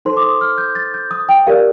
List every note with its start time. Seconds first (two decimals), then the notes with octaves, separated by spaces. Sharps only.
0.05 D#4 A4 C5 C6
0.17 D6
0.23 D#6
0.41 F6
0.58 G6
0.75 A6
0.94 G6
1.11 D#6
1.29 G5
1.47 G4 A#4 D5 F5